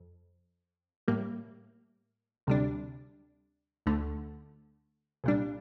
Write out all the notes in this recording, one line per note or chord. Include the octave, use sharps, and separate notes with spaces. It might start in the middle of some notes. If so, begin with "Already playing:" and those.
Already playing: F2
A2 G3 A#3
D2 C3 G3 D4
D2 D3 A3
C2 A#2 G3 D4